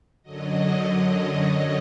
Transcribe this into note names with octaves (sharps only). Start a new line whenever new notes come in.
F#2 D3 F#3 D#5